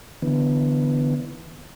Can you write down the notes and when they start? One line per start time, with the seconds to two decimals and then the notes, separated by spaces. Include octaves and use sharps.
0.22 D3 E3 B3